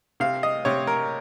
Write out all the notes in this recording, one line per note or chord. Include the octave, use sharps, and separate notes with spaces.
C3 F5
D#5
C3 C#5
A#4